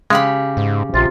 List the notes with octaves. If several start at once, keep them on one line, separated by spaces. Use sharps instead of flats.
C#3 G#3 G4 B5
G#2
A#1 C3 F4